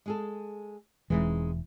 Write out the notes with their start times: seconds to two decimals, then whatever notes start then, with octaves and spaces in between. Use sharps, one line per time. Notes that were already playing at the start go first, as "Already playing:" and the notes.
0.06 G#3 G#4 A4
1.10 E1 E3 G#3 C4 D#4